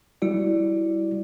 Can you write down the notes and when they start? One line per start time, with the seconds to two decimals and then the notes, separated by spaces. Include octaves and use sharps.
0.22 G3 E4 F#4 D5